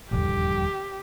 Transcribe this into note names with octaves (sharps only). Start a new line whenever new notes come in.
D#1 A#1 E2 G2 D3 G4